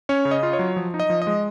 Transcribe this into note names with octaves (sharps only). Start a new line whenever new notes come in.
C#4 C#5
C#3
D#5
F4
C#5
F#3
F3
D#4
D#5
F3
D#5
G#3